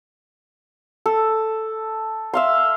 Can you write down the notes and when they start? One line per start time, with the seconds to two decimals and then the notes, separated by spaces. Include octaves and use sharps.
1.06 A4
2.34 E5 F5 C6